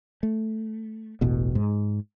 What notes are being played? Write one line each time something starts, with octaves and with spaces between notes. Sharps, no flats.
A3
E1 A1 B2
G#2